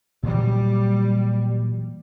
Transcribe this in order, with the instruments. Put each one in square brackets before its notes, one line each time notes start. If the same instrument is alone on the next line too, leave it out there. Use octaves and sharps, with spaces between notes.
[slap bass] A#2 E3 F#3 [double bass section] G3